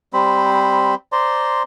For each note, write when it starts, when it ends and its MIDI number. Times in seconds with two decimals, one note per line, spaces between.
0.13 0.95 55
0.13 0.95 60
0.13 0.95 72
0.13 0.95 83
1.12 1.63 72
1.12 1.63 74
1.12 1.63 82
1.12 1.63 84